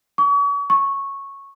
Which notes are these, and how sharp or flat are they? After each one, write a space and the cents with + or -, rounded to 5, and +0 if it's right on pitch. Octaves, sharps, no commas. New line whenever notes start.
C#6 +40
C#6 -10